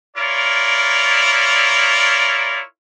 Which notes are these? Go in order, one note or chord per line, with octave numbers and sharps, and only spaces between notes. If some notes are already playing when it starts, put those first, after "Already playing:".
E4 F4 A#4 C#5 D5